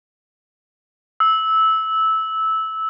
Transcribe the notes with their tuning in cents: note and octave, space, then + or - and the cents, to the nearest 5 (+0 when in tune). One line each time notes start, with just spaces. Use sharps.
E6 -15